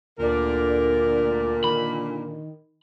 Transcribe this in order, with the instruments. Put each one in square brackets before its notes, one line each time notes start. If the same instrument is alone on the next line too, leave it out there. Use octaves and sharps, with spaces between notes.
[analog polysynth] D2 D5 [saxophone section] A#2 D3 [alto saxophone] A#4
[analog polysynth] D#3 [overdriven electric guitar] B5